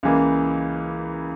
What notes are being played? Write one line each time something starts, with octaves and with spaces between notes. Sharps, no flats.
C#2 C#3 E3 A#3